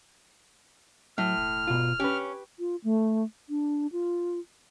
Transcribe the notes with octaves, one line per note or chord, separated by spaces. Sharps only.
A2 F#3 F6
E1
B2 F4
C#4 G4 B4
F4
A3
D4
F4